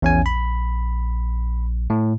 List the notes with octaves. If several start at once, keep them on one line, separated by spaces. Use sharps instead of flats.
A#1 E2 C#4 G#5
B5
A2